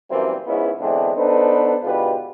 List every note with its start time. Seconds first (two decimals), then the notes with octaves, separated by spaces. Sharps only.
0.11 F#2 A#2 E3 G3 A#3 C4
0.47 C#2 G#2 G#3 B3 C#4 E4
0.80 D3 E3 G#3 B3 C4 D4
1.16 B3 D4 D#4 A4 B4 C5
1.83 G#2 B2 D3 F4 G4 B4